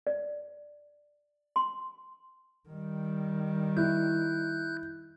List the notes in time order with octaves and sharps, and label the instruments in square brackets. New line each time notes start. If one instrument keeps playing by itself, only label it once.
[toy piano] D5
C6
[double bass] D#3 G3
[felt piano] E4 [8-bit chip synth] F#6 G6